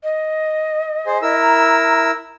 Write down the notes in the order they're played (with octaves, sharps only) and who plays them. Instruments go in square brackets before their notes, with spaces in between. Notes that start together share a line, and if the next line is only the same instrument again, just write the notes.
[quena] D#5
[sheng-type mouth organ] G#4 C5
E4 A#4 E6
[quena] A#5